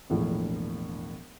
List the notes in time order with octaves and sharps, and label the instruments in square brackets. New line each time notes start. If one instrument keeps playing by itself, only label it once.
[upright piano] E1 A#1 A2